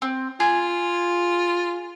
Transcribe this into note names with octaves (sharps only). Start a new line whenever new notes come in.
C4
F4 G#4